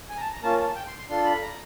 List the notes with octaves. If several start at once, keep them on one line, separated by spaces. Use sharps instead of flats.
G#5
A#5
A5
A#5
A#3 C#4 F4 A5
A5
G5
C6
C6
D4 F4 A4 C6
B5
A#5